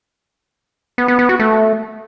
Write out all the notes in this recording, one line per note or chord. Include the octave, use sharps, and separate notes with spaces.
B3
B3
B3
F#4
A3